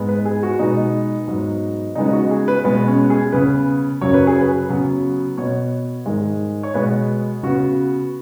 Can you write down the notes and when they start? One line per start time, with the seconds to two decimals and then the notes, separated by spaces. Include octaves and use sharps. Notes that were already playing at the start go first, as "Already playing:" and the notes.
Already playing: G#2 G#3 B3
0.09 B4
0.25 G#4
0.43 F#4
0.59 B2 G#3 B3 D#4
1.28 G#2 F#3 B3
1.95 C#3 G#3 B3 D#4
2.08 D#4
2.13 F#4
2.31 G#4
2.48 B4
2.64 B2 G#3 B3 B4
2.88 C#4
3.10 G#4
3.32 C#3 B3 B4
4.01 F#2 C#3 F#3 C#5
4.14 B4
4.27 G#4
4.40 B4
4.69 C#3 F#3 B3
5.38 B2 B3 C#5
6.06 G#2 D#3 G#3
6.63 C#5
6.74 B2 G#3 B3 B4
7.43 C#3 B3 F#4